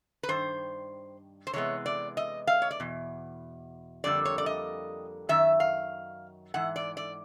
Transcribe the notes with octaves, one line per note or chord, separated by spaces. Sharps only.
B4
G2 D#3 C5
C5
C3 E3 G#3 B3 C#5
D5
D#5
F5
C#5
D5
E2 B2
F2 D3 G3 A#3 D5
C#5
D5
D#5
F#2 D#3 E5
F5
G#2 E3 F#5
D5
D5